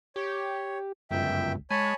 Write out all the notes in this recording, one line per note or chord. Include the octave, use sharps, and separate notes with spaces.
G4 C#5
G1 C#2 F#2 E5 G5
G#3 C#5 G#5 A5 B5